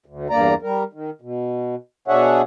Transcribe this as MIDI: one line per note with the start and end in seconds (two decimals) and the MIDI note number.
0.06 0.28 38
0.30 0.54 40
0.30 0.54 43
0.30 0.54 58
0.30 0.54 74
0.30 0.54 82
0.62 0.83 55
0.62 0.83 70
0.93 1.10 51
1.22 1.75 47
2.08 2.42 47
2.08 2.42 62
2.08 2.42 68
2.08 2.42 73
2.08 2.42 76
2.08 2.42 78